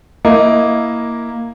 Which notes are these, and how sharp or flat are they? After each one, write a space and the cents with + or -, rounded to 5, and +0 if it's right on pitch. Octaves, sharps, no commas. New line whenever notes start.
A#3 +0 E4 +0 D#5 +10